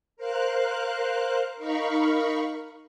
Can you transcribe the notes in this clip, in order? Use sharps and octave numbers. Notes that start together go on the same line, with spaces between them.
A#4 C5 F5 F#6
D#4 A#4 F5 B5 C#6